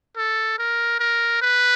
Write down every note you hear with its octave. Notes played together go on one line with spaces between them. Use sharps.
A4
A#4
A#4
B4